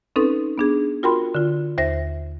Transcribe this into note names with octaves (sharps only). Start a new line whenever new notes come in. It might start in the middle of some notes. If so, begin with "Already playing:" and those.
C4 C#4 D#4 A4 B4
B3 D4 G#4
F4 F#4 A#4 G5 B5 C6
D3 F4
D#2 C5 E5 A#6